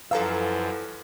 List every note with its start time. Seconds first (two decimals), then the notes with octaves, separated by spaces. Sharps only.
0.11 F#2 E3 F3 A4 F5 A#5 E6